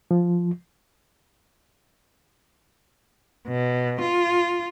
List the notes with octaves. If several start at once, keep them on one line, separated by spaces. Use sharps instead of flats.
F3
B2
F4